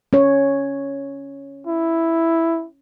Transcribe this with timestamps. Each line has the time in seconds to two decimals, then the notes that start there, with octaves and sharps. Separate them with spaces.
0.13 C#4 C#5
1.67 E4